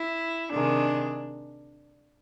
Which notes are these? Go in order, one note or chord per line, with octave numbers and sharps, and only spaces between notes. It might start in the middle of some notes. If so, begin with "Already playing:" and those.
Already playing: E4
C3 D#3 G#3 D4